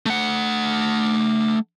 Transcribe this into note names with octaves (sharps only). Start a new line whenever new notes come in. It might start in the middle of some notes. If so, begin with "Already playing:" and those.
A3 F#5